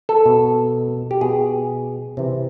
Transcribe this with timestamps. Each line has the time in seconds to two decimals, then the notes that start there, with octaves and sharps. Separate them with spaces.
0.09 A4
0.26 B2
1.11 G4
1.21 B2 G#4
2.17 C3 E3